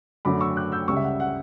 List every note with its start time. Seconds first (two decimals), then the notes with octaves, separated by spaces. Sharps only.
0.25 F#2 D3 A3 B5 D6
0.41 C#6 E6
0.56 D6 F#6
0.72 E6 G6
0.88 C#2 C#3 G3 C#6 E6
0.96 E5
1.03 F#5
1.20 F#5